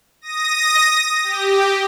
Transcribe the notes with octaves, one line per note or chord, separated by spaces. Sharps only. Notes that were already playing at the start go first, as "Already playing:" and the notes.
D#6 A#6
G4